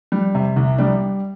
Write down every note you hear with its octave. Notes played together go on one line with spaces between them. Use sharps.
G3
C3
C2
G3 D4